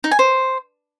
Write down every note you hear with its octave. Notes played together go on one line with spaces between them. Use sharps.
D#4
G#5
C5